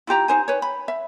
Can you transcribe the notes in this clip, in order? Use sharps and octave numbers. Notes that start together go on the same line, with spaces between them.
E4 F4 G4 A#5
D#4 C5 G#5
B4 C#5
B5
E5